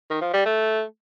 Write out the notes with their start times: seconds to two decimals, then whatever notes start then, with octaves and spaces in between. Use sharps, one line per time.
0.10 D#3
0.21 F3
0.33 G3
0.45 A3